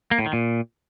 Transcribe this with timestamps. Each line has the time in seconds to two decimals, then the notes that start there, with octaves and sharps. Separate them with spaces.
0.11 A#3
0.19 A2
0.26 D#3
0.33 A#2